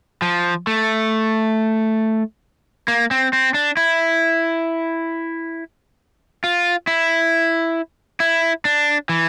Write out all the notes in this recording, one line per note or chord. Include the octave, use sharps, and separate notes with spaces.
F3
A3
A#3
C4
C4
D4
E4
F4
E4
E4
D4
E3